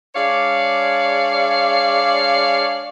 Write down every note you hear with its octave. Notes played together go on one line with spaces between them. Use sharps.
G#3 D4 C#5 D5 F5